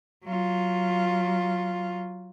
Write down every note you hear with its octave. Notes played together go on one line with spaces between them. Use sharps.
F#3 F4